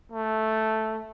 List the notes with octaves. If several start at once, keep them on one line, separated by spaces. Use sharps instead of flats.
A3